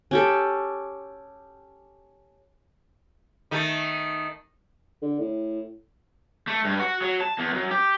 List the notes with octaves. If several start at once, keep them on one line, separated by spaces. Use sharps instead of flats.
C#4 G4 A4
D#3 A3
D3
A2
A3
G2
F#4
F#3
A5
E2
F#2
G4